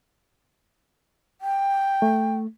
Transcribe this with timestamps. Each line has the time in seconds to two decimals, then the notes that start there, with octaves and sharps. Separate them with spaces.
1.41 G5
2.02 A3